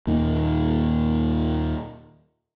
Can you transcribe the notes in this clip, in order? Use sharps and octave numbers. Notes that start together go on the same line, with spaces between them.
D#2 A#2 D#3